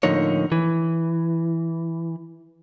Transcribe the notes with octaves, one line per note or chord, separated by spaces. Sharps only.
A2 D3 F3 A#3 D#4 C#5
E3